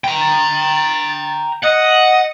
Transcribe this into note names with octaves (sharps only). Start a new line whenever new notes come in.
G5 A#5
A6
D#5 F#5